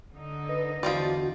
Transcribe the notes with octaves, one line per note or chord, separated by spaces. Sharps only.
D3 D#4
B4 D#5
E2 D3 F3 C4 F#4 D5